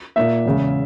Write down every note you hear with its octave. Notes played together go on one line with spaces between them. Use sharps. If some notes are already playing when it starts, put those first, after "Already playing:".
A#2 A#3 E5
E2 C#3 G#3